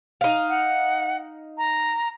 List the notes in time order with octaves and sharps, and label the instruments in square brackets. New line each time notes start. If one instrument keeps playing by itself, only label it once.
[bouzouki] D#4 F5
[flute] F#5
A#5